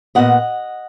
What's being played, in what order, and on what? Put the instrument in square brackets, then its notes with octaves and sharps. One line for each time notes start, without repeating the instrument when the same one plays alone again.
[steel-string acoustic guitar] A#2 F3 B3 D#5 F#5